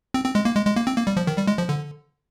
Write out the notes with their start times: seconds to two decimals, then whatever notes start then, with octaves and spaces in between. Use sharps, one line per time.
0.14 C4
0.25 C4
0.35 G#3
0.45 A#3
0.55 G#3
0.66 G#3
0.76 A#3
0.87 C4
0.97 A#3
1.07 G3
1.17 F3
1.27 D#3
1.37 G3
1.47 G#3
1.58 F3
1.69 D3